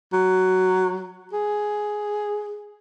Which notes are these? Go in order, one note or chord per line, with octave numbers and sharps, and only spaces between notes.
F#3
G#4